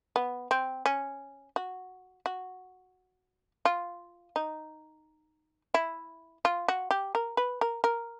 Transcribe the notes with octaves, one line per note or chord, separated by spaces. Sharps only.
B3
C4
C#4
F#4
F#4
F4
D#4
E4
F4
F#4
G4
A#4
B4
A#4
A#4